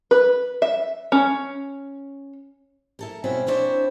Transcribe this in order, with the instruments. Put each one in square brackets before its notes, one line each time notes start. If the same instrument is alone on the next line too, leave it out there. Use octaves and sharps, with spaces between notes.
[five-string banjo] B4
E5
C#4
[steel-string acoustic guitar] E4 A4 A#4
B2 C4 C#4 E4 F#4
B3 C4 D4 E4 C5 C#5